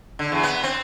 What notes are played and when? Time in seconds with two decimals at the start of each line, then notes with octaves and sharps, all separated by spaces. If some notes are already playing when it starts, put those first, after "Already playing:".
0.19 D3
0.32 E2
0.43 B3
0.64 C4